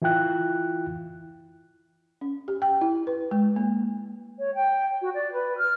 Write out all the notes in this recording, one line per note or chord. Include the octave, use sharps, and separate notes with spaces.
E3 E4 F4 G5 F#6
C#4
G4
G5
E4
B4
G#3
A#3
C#5
G5
F#4
D5
B4
F6